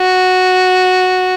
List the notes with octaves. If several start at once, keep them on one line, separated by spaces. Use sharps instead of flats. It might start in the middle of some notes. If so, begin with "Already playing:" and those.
Already playing: F#4